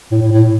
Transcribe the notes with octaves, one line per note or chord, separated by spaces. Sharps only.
A2
A2
A2